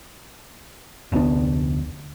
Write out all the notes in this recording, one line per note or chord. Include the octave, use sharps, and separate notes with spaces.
F1 D2 B3 D4